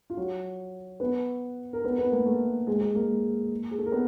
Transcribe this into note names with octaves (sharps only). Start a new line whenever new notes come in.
F4
F#3 F#4
B3 B4
A#4
B3 B4
B3 B4
A#3 A#4
A3 A4
G#3 G#4
G#3 G#4
A#3 A#4
G#4
A4
A#4
B3